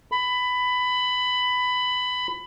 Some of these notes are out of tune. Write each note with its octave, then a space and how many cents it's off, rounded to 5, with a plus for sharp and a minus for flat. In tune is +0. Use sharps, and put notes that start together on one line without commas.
B5 +15